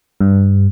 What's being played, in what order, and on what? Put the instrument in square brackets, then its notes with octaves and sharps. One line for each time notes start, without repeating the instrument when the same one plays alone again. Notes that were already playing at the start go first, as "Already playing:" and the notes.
[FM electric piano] G2